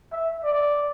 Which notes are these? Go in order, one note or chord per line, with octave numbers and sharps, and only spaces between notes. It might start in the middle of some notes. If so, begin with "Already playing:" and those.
E5
D5